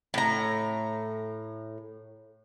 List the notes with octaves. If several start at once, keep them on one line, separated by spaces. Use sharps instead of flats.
A2 A#5